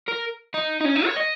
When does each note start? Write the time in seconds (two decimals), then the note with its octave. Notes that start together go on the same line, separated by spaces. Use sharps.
0.08 A#4
0.54 D#4
0.81 D#4
0.85 C#4
0.95 D#4
1.06 C#5
1.16 D#5